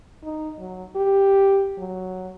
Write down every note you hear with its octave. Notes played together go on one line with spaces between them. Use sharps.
D#4
F#3
G4
F#3